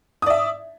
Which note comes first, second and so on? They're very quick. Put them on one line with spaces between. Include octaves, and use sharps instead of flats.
D#6 D5 E5